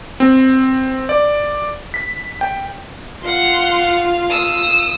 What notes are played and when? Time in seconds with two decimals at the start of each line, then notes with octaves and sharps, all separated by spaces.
0.20 C4
1.09 D5
1.94 B6
2.41 G5
3.23 F4 F5 F#5 C6
4.30 D#6 E6